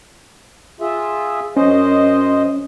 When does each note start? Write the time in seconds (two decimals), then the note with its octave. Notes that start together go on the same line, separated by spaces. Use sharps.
0.81 F4 G#4 E5
1.57 F#2 C#4 C5 D#5